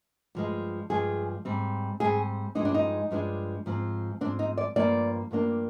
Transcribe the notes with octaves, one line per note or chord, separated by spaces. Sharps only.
G2 F3 G#3
G2 F3 G#3 G#4
G#2 G3 C4
G#2 G3 C4 G#4
G2 F3 G#3 D4 D#4
D4
D#4
G2 F3 G#3 D4
G#2 F3 C4
G#2 F3 C4 D4
D#4
D5
G2 F3 A#3 D4 D5
G2 F3 A#3 D4